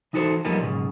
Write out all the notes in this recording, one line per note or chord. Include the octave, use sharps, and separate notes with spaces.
E3 D#4 F#4 A4 C5
F#2 F3 G3 A#3 B3 D#4
B1 G#2 C#3